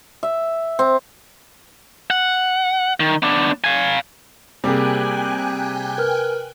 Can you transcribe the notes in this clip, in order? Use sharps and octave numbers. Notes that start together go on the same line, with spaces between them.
E5
C4
F#5
D#3
B3 D4
F5 G#5
C3 G3 A#3 G#4 G5 G#5 F#6
A#4 B4 F6